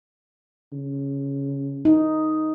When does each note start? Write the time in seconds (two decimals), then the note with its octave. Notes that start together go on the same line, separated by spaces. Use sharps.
0.73 C#3
1.85 D#4